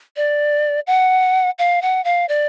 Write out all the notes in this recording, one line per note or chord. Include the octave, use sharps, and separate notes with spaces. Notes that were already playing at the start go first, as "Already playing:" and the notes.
D5
F#5
F5
F#5
F5
D5